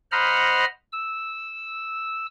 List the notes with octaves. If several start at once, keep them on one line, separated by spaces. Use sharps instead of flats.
C5 D#5 F#5 A#5 B5 F6
E6